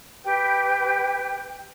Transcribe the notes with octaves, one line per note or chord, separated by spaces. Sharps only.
G4 B4 G5 G6